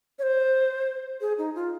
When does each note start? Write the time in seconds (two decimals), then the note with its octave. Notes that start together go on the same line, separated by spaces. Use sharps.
0.19 C#5
0.23 C5
1.21 G#4
1.38 D#4
1.55 F4